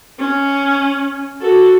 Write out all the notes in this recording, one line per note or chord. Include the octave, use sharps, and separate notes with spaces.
C#4
F#4 A4